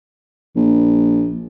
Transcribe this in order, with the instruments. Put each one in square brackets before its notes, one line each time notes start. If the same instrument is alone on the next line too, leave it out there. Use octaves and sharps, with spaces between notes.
[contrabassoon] A#1